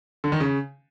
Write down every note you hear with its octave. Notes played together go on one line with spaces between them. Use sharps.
D3
D#3
C#3